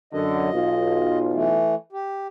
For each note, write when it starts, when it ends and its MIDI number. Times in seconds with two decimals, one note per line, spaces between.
0.13 0.53 42
0.13 0.53 50
0.13 1.19 75
0.53 1.59 35
0.53 1.59 65
1.33 1.75 52
1.33 1.75 57
1.93 2.27 67